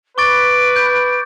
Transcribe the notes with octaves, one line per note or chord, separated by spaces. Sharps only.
B4 C#6 D6 A6 D7
G6